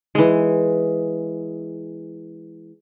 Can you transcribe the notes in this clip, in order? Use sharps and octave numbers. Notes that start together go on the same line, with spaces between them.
E3 G#3